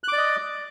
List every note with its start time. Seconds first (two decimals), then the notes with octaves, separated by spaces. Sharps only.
0.04 F#6
0.08 D6
0.13 D5
0.17 D#5